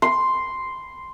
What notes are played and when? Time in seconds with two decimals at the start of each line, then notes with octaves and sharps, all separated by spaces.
0.02 C6